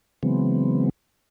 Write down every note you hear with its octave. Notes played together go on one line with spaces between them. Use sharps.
C#3 E3 F#3 G#3 B3 C4